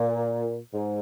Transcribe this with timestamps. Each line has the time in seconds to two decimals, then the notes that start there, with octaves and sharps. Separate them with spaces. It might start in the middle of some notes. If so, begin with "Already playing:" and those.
Already playing: A#2
0.73 G#2